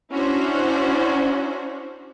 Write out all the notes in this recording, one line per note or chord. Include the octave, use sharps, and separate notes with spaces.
C#4 D4 E4 F#4 C5